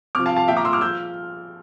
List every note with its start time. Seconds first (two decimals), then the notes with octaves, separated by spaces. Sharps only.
0.15 C3 D6 F6
0.18 F3
0.26 F5 A5
0.36 F5 A5
0.48 A#2 F3 E5 G5
0.57 A#5 D6
0.65 C6 E6
0.73 D6 F6
0.81 F3 E6 G6